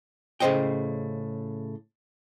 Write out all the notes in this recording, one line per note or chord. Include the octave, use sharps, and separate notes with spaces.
A2 C#3 G#3 C5 D#5 G5